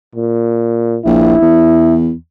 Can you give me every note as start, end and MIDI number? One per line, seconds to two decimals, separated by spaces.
0.16 0.98 46
1.05 1.35 34
1.05 1.95 64
1.42 2.12 40